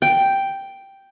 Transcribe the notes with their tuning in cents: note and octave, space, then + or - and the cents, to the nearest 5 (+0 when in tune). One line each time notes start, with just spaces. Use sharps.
G5 +0